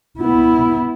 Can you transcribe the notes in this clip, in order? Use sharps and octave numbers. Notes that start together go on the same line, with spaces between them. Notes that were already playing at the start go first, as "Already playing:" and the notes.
B3 E4